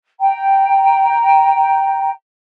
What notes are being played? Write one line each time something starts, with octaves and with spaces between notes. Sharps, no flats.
G5 A#5